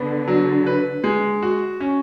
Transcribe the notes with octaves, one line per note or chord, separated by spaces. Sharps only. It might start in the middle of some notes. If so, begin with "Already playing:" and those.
Already playing: D3 B3
F#3
B4
G#3
F#4
C#4